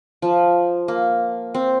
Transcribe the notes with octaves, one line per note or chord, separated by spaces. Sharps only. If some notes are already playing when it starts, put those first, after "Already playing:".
F3
A#3
C4